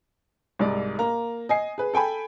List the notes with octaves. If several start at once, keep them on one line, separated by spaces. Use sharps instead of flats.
C2 G#2 D5
A#3 A#5
D#5 G#5 C7
G#4 B4
A4 G5 G#5 B5